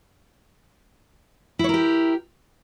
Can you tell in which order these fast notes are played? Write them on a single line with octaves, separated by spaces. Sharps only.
E4 C#5 A#4 G4